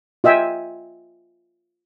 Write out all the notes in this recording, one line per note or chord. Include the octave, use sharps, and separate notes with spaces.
F4 D#5 E5 G5 G#5